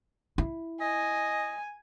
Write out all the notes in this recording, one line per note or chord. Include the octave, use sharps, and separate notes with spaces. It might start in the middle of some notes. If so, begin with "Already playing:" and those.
E4
D#5 G#5